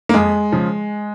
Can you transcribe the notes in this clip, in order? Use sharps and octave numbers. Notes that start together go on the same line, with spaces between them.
A#3
F2 G#3
C#3 F3